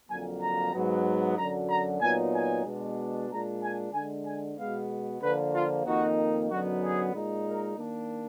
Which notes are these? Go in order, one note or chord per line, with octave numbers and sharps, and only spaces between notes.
F2 D3 F#3 A#3 G#5
A#5
G#2 F#3 B3
F#2 D3 F#3 A#5
A#5
A#2 F#3 B3 D#4 G#5
G#5
B2 G#3 D4
A#2 G#3 D4 A#5
G#5
D3 G#3 D4 G#5
G#5
B2 G#3 B3 F5
D3 F3 A#3 B4
F4
F2 D#3 A#3 D#4 F#4
F#2 D3 F#3 B3 D#4 F#4
G#4
A#2 G#3 D#4
A#4
D#3 A#3 D4